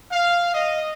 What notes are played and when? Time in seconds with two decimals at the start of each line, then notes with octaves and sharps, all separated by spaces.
0.12 F5
0.54 D#5